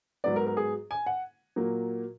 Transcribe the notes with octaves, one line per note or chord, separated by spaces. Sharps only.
G#2 F#3 B3 D5
A#4
A#4
G#4
G#5
F#5
A#2 F#3 A#3